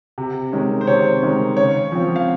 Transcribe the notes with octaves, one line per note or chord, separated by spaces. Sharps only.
C3
D#3 G#3 C#4
C5
C3 C#5
D#3 G#3 C#4
C#3 C#5
F3 C4
F5